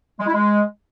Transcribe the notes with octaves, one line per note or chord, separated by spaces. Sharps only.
G#3
E4
G#3